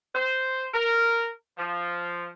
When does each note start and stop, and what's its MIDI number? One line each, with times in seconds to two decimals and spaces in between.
0.15 0.67 72
0.74 1.28 70
1.58 2.29 53